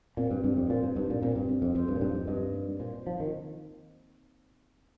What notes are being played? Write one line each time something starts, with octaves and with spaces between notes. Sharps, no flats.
A#2 C4
G2
G2 C4
F2
A#2 C5
G2
G2 D#4
A#2
A#2 C4
G2
C4
F2
F2 C5
G2
A#2
G2 D#4
F2
G2 D#5
A#3
A#2 C5
F3 D#4
D#3